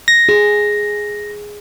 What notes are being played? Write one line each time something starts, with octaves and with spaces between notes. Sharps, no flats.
A#6
G#4